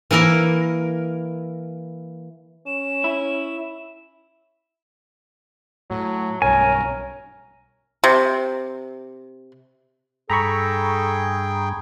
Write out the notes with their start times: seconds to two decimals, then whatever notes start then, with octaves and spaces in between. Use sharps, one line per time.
0.11 E3 A#3 E4 A#4
2.67 C#4 E7
3.04 E4
5.91 A2 F#3
6.42 B1 G2 A#4 C#5 G#5
8.04 C3
10.30 G2 G#4 A4 G5 A#5 B5 C#6